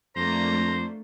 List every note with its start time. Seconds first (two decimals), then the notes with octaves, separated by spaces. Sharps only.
0.16 F2 A3 A#3 D4 C5 A#5